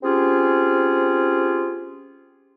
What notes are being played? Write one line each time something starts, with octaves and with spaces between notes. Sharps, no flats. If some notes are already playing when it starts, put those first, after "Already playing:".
C4 C#4 F4 G4 G#4